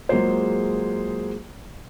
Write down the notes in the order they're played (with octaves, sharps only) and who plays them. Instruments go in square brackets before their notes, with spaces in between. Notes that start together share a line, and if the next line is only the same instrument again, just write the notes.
[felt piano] F#3 G#3 A#3 F4 G#4 C5